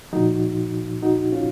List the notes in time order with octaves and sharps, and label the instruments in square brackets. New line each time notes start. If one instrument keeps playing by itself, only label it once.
[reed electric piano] A#2 F3 D#4 F#4
D#4 F#4
C#4 F4